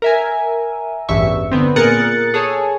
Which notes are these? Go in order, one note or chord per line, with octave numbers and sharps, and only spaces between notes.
A#4 E5 G#5
A1 E2 G2 E5 C#6
D3 B3 C4
A#2 G#4 A#4 F#6 A6 C#7
G#4 A4 C#5 G#5